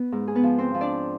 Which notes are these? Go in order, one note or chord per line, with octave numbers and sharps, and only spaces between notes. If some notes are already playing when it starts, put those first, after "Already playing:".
Already playing: B3 B4
G#2
G#4
B3 B4
F3
C4 C5
F3
D4 D5